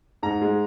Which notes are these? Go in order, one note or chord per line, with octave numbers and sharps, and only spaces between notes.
G#2 A#5
G#3